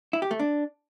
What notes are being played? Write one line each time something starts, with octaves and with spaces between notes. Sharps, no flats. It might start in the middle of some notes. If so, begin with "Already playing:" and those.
E4
G4
A3
D4